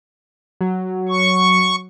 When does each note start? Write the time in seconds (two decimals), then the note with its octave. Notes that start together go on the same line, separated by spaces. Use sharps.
0.61 F#3
1.09 C#6